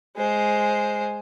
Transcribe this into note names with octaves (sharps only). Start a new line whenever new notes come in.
G#3 C5